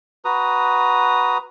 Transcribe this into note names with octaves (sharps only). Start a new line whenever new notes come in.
F#4 B4 A#5 D#6